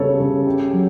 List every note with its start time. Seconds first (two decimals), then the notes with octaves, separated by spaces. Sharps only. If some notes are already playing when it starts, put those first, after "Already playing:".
Already playing: C#3 G3 B3 A4 C#5
0.20 C#3
0.47 G4
0.73 F#3